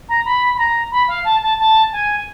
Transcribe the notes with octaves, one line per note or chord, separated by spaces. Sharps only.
A#5
B5
B5
A#5
B5
F5
A5
A5
A5
G#5